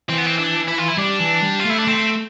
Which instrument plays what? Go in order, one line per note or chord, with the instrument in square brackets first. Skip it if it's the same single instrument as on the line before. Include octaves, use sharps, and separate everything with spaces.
[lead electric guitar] E3 [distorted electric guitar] C4
[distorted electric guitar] B3
C4
D4
E4
F4
E4
[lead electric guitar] G3 [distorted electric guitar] D4
[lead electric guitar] E3
G3
[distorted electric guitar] F4
[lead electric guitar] A3 [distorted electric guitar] E4
[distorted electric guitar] D4
[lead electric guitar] A3 [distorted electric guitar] C4